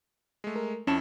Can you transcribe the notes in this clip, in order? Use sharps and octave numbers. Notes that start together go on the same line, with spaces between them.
G#3 A3
A#4
F2 C#4 E4 A5 C#6 E7